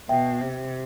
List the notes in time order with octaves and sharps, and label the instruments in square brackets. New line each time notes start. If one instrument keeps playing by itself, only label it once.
[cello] B2 [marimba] E5 G5
[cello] C3